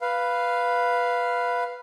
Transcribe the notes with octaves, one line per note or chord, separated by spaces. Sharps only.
B4 F5